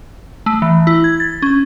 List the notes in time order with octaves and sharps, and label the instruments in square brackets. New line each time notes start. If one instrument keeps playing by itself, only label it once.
[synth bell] A3
E3
E4
G#6
A6
C#4